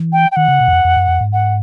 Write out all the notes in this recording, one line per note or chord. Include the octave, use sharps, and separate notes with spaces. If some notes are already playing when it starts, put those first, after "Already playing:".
Already playing: E3
G5
G5
D#3 F#5
C#3
B2
F#2
F2
F2
F#2
F2
G#2
F#5